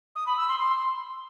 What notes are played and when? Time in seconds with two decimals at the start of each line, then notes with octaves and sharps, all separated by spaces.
0.16 D#6
0.26 B5
0.37 E6
0.48 C6
0.59 C6